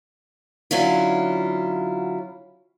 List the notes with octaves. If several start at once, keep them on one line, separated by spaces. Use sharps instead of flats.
D3 F#3 C#4 E4 F4